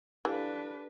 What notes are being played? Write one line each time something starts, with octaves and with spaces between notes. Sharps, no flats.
E3 D4 G4 A4 B4 F5